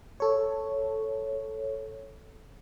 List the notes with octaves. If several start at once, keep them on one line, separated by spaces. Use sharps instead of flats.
A4 C#5